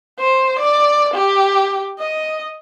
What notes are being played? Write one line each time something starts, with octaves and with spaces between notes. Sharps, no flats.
C5
D5
G4
D#5